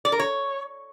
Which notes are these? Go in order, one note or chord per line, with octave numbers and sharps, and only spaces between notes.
D5
A#4
C#5